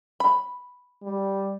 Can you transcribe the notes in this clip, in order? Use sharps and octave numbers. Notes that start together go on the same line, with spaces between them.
B5
G3